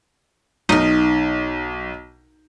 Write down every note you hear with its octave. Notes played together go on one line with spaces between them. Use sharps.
B1 D#4 A#4